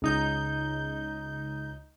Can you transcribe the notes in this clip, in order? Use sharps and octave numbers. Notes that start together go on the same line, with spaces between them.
C#2 D#4 G6